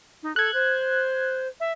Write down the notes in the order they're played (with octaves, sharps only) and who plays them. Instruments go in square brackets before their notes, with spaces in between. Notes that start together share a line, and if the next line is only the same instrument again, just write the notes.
[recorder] D#4
[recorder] A4 [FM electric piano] F#6 G#6
[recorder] C5
E5